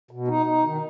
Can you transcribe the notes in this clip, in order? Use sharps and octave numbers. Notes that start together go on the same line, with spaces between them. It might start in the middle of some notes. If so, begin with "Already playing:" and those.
B2
D#4
D#4
D#3